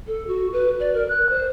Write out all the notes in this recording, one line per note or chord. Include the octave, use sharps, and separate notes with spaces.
A4
F#4
B4
D5
A#4
F#6
C5